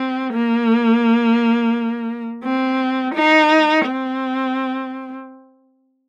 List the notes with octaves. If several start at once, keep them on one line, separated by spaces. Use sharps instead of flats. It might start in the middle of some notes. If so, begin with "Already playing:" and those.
Already playing: C4
A#3
C4
D#4
C4